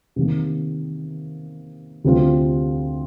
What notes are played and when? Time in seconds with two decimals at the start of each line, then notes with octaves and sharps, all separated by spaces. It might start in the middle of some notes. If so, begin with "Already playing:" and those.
0.16 C3 D#3 A#3
2.04 D2 C3 G3 C4 F4